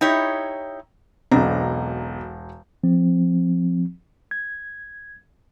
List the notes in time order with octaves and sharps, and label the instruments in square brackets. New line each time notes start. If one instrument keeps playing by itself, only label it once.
[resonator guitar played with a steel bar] D#4 E4 G4 C#5
[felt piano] E1 A#5 [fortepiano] B1 [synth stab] C4 D4
[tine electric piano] F3 C4
G#6